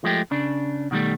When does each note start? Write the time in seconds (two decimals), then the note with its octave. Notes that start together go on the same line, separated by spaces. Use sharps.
0.04 F3 G#3 A3 G4
0.31 C#3 D4
0.91 B2 D#3 F3 G3 A3